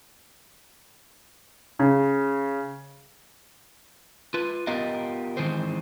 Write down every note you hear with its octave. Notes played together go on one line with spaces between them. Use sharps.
C#3
F4 B4
B3 F4 G4 A#4 D#5 F5
D#3 E3 G#3 C4 C5